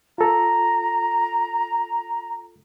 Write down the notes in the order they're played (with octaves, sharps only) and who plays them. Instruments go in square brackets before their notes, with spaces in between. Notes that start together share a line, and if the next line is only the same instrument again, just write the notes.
[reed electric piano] F4 A4 [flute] A#5